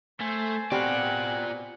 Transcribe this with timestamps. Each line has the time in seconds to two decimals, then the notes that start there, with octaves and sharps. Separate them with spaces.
0.21 A3 C5 G#5
0.72 B2 C4 F4 G4 D5 F#5